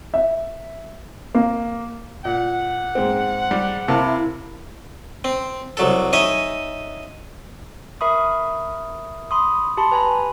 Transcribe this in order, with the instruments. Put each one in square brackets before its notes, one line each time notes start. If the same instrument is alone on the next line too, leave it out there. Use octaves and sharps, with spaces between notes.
[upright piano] E5
A#3
[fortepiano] A#2 [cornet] F#5
[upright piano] G#2 C4
[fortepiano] G3
[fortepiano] C3 [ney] E4 [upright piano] A#4 F5 A5
[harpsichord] C4
C2 F#3 A4
D#4 C#5 D#5 E5 G#5
[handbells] A#4 E5 B5 C#6 D#6
B5 C6 D#6
G4 A5 B5 C6
B4 G#5 A#5 B5